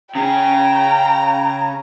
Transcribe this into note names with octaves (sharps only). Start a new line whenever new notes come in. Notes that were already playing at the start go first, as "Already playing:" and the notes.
C#3 G#4 G5 A#5